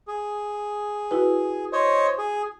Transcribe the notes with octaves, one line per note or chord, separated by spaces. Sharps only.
G#4
E4 F#4 B4
C5 C#5 D#5
G#4